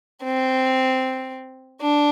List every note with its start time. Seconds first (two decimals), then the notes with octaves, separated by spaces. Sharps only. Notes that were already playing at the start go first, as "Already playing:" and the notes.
0.24 C4
1.81 D4